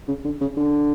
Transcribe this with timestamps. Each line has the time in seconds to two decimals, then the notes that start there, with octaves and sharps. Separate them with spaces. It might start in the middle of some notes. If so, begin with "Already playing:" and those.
0.08 C#3
0.24 D3
0.41 C#3
0.57 D3